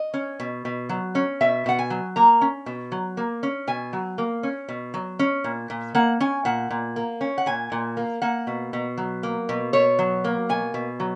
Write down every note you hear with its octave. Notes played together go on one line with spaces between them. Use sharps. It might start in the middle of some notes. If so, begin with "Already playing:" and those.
Already playing: D#5
C#4
B2
B2
F#3
C#4
B2 E5
B2 F#5
G#5
F#3
A#3 A#5
C#4
B2
F#3
A#3
C#4
B2 G#5
F#3
A#3
C#4
B2
F#3
C#4
A#2
A#2
A#3 F#5
C#4 G#5
A#2 F#5
A#2
A#3
C#4
F#5
A#2 G#5
A#2
A#3
A#3 F#5
B2
B2
F#3
A#3
B2
B2 C#5
F#3
A#3
B2 G#5
B2
F#3